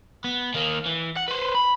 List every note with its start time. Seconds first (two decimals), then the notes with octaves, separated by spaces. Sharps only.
0.24 B3
0.54 D#3 A#3
0.86 E3
1.17 F#5
1.28 B4 C5
1.55 B5